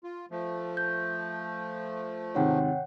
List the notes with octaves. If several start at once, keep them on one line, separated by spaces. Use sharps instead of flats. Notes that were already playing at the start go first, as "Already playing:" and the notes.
F4
F3 A3
G6
G#2 C3 D#3 C#5 F#5 G5